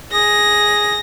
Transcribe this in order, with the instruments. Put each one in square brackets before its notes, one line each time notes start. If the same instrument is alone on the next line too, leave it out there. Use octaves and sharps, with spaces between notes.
[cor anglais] G#4 [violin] A#6